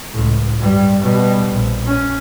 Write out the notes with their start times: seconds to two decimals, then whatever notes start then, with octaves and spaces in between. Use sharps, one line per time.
0.12 C#2 A2
0.58 G2 G3
1.00 B2 G3
1.50 A#1
1.86 C#4